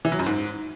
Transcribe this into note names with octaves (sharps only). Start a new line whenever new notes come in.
E3
F#3
F#2
G#2